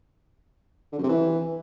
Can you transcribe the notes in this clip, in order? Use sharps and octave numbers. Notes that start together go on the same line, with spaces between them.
D3
F#2
C3
E3